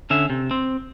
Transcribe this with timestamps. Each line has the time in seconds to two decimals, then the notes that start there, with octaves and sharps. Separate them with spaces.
0.10 D3 C#4 E5
0.30 C3
0.51 C4